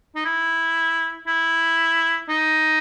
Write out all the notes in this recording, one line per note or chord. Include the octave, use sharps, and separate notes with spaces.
D#4
E4
E4
D#4